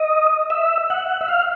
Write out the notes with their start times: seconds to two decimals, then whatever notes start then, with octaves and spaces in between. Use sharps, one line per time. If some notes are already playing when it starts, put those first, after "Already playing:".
Already playing: D#5
0.50 E5
0.90 F#5
1.21 E5
1.28 F5